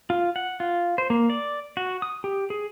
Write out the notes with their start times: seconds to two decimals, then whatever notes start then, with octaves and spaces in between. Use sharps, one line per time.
0.10 F4
0.36 F#5
0.60 F4
0.98 C5
1.10 A#3
1.30 D5
1.77 F#4
2.02 D#6
2.24 G4
2.50 G#4